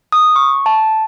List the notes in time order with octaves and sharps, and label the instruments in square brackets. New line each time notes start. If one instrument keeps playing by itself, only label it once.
[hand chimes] D#6
C#6
A5